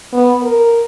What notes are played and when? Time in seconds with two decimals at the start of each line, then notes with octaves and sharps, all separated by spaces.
0.13 B3
0.43 A#4